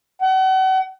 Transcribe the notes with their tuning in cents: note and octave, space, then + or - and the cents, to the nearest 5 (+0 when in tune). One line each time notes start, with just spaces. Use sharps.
F#5 +40